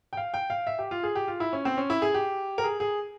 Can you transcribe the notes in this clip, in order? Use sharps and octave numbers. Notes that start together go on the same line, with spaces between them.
G5
F5
G5
F5
E5
G4
F4
G#4
G4
F4
E4
C#4
C4
C#4
E4
G#4
G4
A#4
G#4
G#4